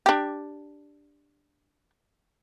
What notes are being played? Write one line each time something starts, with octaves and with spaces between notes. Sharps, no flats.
D4 G4